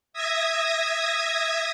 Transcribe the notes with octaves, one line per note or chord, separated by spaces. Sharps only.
E5 D#6 G#6 A#6